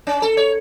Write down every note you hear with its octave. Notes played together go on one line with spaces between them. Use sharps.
C#4
A4
C#5